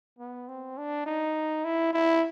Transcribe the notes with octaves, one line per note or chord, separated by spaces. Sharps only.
B3
C4
D4
D#4
E4
E4